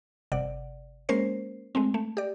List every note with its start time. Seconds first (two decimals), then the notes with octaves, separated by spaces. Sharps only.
0.32 G1 C3 D5 F#5
1.09 G#3 A#3 C#4 A#4 C5 C7
1.75 G#3 A3 C4
1.94 A3
2.17 G4 D5